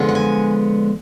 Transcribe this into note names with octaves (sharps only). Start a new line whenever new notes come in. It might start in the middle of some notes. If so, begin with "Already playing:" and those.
Already playing: D3 F3 G#3 B3
F#5
G#5